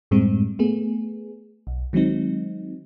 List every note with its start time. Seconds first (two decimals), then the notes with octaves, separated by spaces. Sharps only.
0.11 F#2 A2 G3 G#3 C4
0.59 A3 B3 G#4
1.67 B1
1.93 D#3 F#3 G#3 C4 D#4